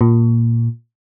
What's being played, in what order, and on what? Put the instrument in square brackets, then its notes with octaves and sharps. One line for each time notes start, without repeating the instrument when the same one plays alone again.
[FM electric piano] A#2